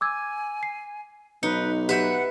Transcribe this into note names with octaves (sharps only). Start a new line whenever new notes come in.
G#5 D6 E6 G#6
C7
B1 D#4 B4 C#7
G4 B4 E5 F#5 G6